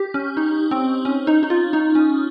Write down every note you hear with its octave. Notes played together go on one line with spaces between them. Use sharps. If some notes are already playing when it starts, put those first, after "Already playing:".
Already playing: G4
C#4
D#4
C4
C#4
D#4
D#4
F4
D#4
C#4